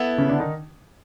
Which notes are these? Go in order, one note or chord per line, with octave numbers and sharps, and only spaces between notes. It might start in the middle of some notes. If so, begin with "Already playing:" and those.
Already playing: B3 E4 A4
C#3 C#4
D3 D4
D#3 D#4